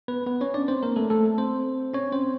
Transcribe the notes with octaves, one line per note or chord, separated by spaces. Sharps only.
B3 B4
B3 B4
C#4 C#5
D4 D5
C4 C5
A#3 A#4
A3 A4
A3 A4
C4 C5
C#4 C#5
C4 C5